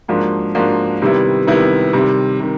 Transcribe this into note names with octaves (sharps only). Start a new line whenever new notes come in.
G#2 F3 A#3 D4 F#4
G#2 F3 A#3 D4 F#4
C3 D#3 G3 B3 E4
C3 D#3 G3 B3 E4
C3 D#3 G3
C3 D#3